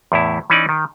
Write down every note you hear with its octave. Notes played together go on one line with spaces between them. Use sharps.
E2 A2 E4
E3 C#4 D#4 D5
D#3